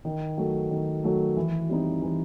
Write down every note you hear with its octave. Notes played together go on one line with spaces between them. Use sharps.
D#3
F#3 A3
D#3
F#3 A3
E3
G3 C4 D#4
E3